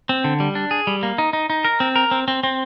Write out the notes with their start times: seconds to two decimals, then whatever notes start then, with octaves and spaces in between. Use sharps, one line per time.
0.09 C4
0.24 D3
0.40 G3
0.55 D4
0.71 G#4
0.87 G3
1.03 A#3
1.18 D#4
1.33 D#4
1.50 D#4
1.65 A#4
1.80 C4
1.96 A#4
2.11 C4
2.28 C4
2.43 C4